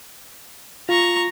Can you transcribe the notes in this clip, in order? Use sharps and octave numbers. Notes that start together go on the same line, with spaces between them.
F4 A#5 C#6